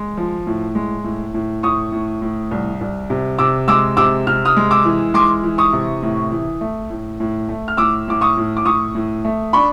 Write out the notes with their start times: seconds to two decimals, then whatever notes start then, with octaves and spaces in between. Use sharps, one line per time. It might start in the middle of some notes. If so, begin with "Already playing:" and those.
Already playing: G#3
0.17 F3
0.47 A2
0.75 G#3
1.04 A2
1.34 A2
1.63 A2 C#6 D#6
1.92 A2
2.22 A2
2.51 C2
2.81 C2
3.10 C3
3.38 C3 D6 E6
3.68 G#3 D6 E6
3.97 C3 D6 E6
4.27 C3 F6
4.45 D#6 F6
4.57 G#3
4.71 D6 E6
4.85 E3
5.14 G#3 C6 D6
5.43 E3
5.58 C#6 D#6
5.73 C3
6.03 A2
6.32 E3
6.61 A3
6.90 A2
7.20 A2
7.49 A3
7.68 F6
7.77 A2 D6 E6
8.08 A2 D6
8.21 C#6 D#6
8.37 A2
8.57 D6
8.65 A2 C#6 D#6
8.95 A2
9.25 A3
9.53 D4 B5 C#6